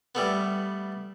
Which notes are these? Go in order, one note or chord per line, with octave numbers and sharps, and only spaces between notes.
G3 A3 B3